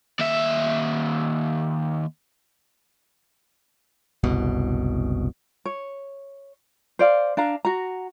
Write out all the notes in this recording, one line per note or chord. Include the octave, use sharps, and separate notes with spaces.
D#2 E5
F#1 C2 B2
C#5
C5 D5 F5
D4 F5 A#5
F#4 A#5